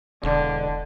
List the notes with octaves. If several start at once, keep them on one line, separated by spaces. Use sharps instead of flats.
E1 D3